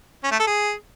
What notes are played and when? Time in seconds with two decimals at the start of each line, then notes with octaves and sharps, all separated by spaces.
0.24 C#4
0.32 A3
0.39 A4
0.47 G#4